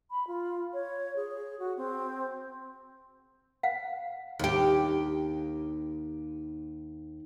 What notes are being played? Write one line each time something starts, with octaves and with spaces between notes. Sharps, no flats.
B5
F4
C#5
G#4
F#4
C4
F5 F#5
D#2 G4